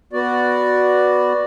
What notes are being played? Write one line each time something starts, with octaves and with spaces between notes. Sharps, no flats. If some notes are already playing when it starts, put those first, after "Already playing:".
B3 F#4 D5